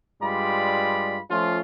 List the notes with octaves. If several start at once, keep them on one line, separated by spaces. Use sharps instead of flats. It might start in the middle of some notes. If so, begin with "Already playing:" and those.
G2 G3 G#3 F4 D5 B5
F3 A3 C#4 F4